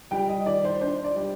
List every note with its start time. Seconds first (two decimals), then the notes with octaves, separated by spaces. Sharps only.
0.11 G3 G5
0.28 D#5
0.46 D#3 D5
0.65 C5
0.81 D4 C5
1.04 D5
1.16 G3